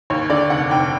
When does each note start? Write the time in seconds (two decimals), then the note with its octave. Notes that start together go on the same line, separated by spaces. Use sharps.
0.10 D#2 C#5
0.30 D3 D5
0.50 F1 F#5
0.71 F1 G5